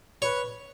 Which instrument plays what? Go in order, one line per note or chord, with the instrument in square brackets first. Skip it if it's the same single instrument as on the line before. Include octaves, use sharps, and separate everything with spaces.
[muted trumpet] B4 [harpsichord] C#5